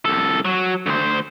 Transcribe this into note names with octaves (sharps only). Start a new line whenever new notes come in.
C2 A4
F#3
D2 C5